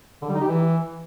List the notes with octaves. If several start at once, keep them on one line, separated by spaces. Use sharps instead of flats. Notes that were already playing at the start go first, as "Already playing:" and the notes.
D3
G3
D#4
G4
E3